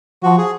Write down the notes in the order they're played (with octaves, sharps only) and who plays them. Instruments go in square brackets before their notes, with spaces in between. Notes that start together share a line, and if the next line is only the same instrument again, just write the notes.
[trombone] F3 [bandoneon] F#4
[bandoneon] G#4